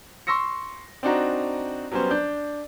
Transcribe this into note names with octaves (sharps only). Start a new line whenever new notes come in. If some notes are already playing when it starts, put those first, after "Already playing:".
C6 C#6 E6 A#6 C#7
C4 D4 D#4 F#4 A#5
F#3 G3 B3 C#4 C5
D4 G6